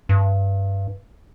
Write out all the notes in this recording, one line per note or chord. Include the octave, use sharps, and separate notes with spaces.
G2